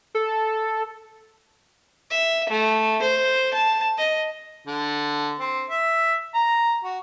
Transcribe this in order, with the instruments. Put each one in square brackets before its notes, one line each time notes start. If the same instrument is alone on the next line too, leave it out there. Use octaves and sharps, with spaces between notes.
[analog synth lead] A4
[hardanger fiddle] E5
A3
C5
A5
D#5
[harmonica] D3
C4
E5
A#5
F#4